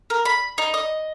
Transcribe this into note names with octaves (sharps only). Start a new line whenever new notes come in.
A#4
B5
D#4
D#5